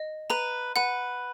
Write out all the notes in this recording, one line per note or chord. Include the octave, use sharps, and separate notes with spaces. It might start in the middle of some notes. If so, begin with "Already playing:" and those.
Already playing: D#5
B4 A#5
B4 F#5